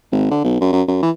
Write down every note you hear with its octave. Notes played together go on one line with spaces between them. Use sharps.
G#1
D3
B1
F#2
F#2
F#2
E3